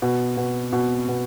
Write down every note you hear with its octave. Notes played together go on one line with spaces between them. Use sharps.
B2
B2
B2
B2